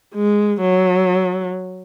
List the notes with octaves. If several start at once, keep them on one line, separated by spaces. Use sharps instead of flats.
G#3
F#3